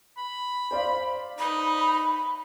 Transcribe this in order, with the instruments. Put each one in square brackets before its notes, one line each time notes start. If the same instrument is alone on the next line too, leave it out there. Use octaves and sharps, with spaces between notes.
[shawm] B5
[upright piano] C5 D5 F5
[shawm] D#4 [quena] B5